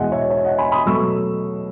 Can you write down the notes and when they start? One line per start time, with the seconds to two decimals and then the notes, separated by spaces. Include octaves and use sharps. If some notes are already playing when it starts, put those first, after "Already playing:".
Already playing: E2 B2 G#3 D#5 E5 F#5 G#5
0.12 C#5 E5
0.30 C#5 E5
0.45 D#5 F#5
0.58 G#5 B5
0.72 B5 D#6
0.86 B2 F#3 A3 C#6 E6